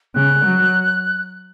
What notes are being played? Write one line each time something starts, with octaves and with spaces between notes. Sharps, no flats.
C#3 F#6
F#3